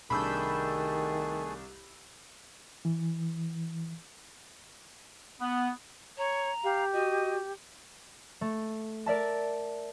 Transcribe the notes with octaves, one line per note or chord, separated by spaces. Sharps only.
C2 D#3 A3 D4 G#4 B5 E6 G6
E3
B3
C#5 A#5
G4 F5
F#4 D#5
A3
A#4 D5 E5 A5